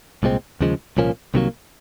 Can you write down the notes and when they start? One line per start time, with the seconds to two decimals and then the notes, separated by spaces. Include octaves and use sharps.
0.23 C2 A#2 G#3 C4
0.61 D#2 C#3 F3 G#3
0.97 C2 A#2 F3 A#3 C#4
1.34 C2 C3 D#3 F#3 A#3